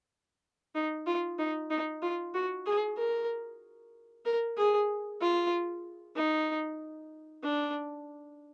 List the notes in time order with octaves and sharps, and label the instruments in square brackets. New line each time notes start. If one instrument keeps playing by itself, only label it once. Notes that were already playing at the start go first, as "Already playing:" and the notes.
[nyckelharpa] D#4
F4
D#4
D#4
F4
F#4
G#4
A#4
A#4
G#4
F4
D#4
D4